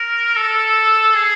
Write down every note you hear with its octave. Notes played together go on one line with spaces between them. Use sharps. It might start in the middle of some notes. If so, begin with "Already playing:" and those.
Already playing: A#4
A4
G#4